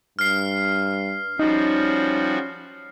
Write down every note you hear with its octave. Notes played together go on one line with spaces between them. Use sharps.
G2 F6 C7
F3 G3 C#4 D#4 F#4